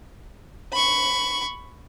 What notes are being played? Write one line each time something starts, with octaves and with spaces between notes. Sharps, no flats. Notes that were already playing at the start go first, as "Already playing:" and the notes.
B5 C#6